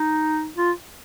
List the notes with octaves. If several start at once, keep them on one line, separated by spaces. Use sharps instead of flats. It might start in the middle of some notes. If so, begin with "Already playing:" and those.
Already playing: D#4
F4